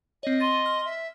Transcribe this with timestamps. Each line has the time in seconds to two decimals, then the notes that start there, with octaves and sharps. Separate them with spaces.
0.23 C4 C#5 D#5
0.40 C6 A6 D#7
0.66 F6
0.85 E5